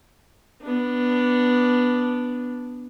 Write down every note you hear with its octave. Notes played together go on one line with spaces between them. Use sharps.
B3 D4